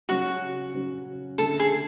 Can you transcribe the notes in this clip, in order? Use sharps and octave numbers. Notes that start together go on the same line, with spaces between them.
C#3 F#3 C#4 F#4
C#3 F#3 C#4
D3 A3 D4 A4
G#4